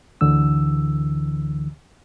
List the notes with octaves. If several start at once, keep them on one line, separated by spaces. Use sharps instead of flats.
D2 D3 E3 E6